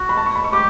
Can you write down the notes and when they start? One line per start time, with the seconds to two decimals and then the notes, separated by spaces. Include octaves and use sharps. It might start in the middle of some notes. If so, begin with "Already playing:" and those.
Already playing: F#4
0.09 B5
0.17 A5
0.26 C#6
0.35 B5
0.44 C#6
0.53 G4 D6